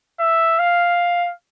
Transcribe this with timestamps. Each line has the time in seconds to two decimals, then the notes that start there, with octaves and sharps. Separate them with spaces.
0.20 E5
0.59 F5